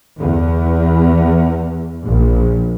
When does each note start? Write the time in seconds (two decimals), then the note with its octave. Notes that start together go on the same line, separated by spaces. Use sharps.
0.18 E2
2.06 A#1